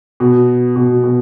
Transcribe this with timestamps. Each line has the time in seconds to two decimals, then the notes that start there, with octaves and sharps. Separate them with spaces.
0.20 B2
0.76 B2
1.04 B2